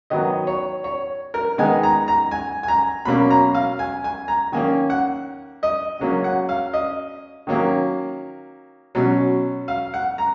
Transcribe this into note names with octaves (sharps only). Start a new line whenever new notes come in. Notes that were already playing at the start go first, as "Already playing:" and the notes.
D#3 F#3 B3 D#5
C#5
C#5
A#4
D#3 G#3 B3 D#4 G#5
A#5
A#5
G#5
G#5
A#5
B2 F#3 A#3 C#4 B5
A#5
F5
G#5
G#5
A#5
D#3 A#3 C#4 G#5
F#5
D#5
C#3 F#3 A#3 C#4
F#5
F5
D#5
D#3 F#3 A#3 C#4
B2 F#3 C#4
F5
F#5
A#5